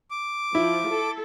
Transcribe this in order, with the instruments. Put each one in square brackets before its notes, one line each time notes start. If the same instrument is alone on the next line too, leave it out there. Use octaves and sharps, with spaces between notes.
[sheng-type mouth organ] D6
[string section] F3 [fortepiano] E4
[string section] A4